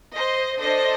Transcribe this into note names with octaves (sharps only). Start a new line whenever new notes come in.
C5 D#5
D4 A4 C5 D#5